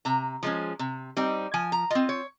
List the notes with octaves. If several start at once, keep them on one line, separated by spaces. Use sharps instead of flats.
C3 A#5
F3 G#3 C#4
C3
G3 C4 D#4
F3 G#5
A#5
C4 F4 D#5
C#5